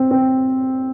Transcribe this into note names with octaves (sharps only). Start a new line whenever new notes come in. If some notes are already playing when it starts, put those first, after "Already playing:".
Already playing: C4
C4